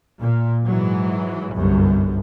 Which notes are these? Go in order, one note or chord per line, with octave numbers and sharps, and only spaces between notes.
A#2
G#2 E3 F#3
G1 C2 F#2